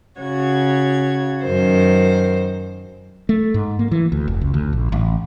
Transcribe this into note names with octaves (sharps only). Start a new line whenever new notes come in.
C#3 F#4 C#5 G#6
F#2 D#3 C5
A3
G#2
A#3
E3
D2
F1
C#2
D2
A#1
A1